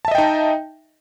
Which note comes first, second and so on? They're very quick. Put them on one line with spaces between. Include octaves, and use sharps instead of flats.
A5 E5 D#5 G5 D#4